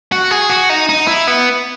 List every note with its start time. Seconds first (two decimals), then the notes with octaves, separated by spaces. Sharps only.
0.12 F#4
0.31 G#4
0.50 F#4
0.70 D#4
0.89 D#4
1.07 E4
1.27 B3